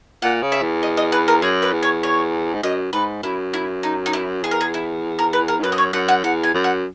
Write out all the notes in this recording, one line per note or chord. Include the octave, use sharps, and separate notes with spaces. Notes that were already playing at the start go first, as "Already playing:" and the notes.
A#2 F#5
C#3
E5
E2
D#5
D#5
B4
A#4
F#2 G#4
B4
E2
C#5
C#5
G#2
F#2 D#5
G#2 B4
F#2 E4
E4
D#4
D#4
E4
E2 G#4
A#4
G#4
E4
A#4
B4
A#4
G#2
F#2 B4
D#5
C#5
F#2 F#5
F#5
E2 F#5
G#5
F#2
F#5